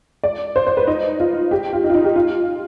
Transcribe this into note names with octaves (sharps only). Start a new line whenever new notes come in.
D5
C5
C5
B4
D#4
F4
G4
F4
D#4
F4
D#4
G4
F4